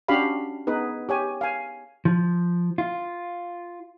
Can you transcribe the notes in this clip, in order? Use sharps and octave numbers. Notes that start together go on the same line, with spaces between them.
C#4 D4 F#4 G4 F5 B5
B3 D#4 G#4 B4
G4 C#5 G#5
F5 G#5
F3
F4